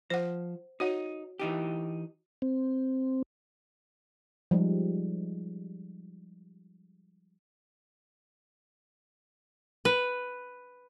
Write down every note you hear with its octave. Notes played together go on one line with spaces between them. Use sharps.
F3 C5 F#5
D#4 F#4 C#5 F#5
E3 D#4 G4
C4
F3 G3 G#3 D#4
B4